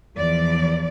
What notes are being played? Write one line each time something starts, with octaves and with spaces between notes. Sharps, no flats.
E2 F3 D5